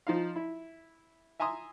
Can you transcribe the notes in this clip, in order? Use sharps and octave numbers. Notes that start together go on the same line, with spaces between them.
F3 D#4 F5
E4
E5 G#5 A#5 C6 D#6